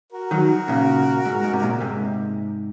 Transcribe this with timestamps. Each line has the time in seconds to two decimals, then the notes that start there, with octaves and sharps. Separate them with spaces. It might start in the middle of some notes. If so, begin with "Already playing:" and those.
0.12 F#4 A#4
0.31 D#3 F#3
0.68 A#2 C#3
1.25 G#2
1.44 G#2
1.53 C3
1.63 A#2
1.80 G#2 C3